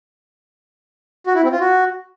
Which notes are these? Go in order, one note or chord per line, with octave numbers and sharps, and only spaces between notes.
F#4
E4
C4
F4
F#4